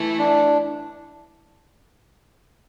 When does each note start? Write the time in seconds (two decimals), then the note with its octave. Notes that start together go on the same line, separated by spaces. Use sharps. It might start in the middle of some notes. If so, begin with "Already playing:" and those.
Already playing: E3 A3 E4
0.19 D4